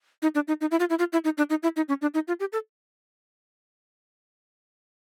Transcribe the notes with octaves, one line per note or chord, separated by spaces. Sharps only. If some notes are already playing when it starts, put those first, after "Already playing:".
D#4
D4
D#4
D#4
E4
F4
E4
F4
E4
D#4
D4
D#4
E4
D#4
C#4
D4
D#4
F4
G4
A4